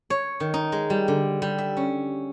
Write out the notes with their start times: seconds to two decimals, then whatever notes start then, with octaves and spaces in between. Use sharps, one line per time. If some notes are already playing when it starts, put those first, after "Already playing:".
0.10 C#5
0.40 D#3
0.54 D#4
0.72 G#3
0.90 G3
1.08 D3
1.42 G3
1.58 E5
1.77 C#4